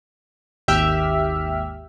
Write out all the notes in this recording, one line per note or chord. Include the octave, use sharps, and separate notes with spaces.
G#1 D#2 G4 E5 F6